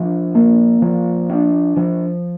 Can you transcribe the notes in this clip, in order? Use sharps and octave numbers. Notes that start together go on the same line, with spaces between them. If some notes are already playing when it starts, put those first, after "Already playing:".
Already playing: F3 D4
A#3
F3
D4
F3